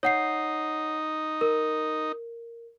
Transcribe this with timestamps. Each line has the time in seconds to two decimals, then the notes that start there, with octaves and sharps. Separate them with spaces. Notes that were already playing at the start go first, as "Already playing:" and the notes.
0.03 D#4 C#5 F#5 C7
1.41 A#4